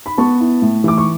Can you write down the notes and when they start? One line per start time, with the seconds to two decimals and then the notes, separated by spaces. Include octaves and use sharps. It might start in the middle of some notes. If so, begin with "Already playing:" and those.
0.06 B5
0.18 B3 A5 C#6
0.40 E4
0.62 A2
0.84 E3 D6
0.98 C#6